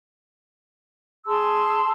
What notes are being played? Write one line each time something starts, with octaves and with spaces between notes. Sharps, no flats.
G#4 A5 C6 E6